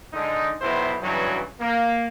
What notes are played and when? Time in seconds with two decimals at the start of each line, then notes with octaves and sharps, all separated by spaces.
0.13 D3 G#3 D#4
0.61 B1 C3 B3 E4 C5
1.01 G2 C#3 E3 F#3
1.60 A#3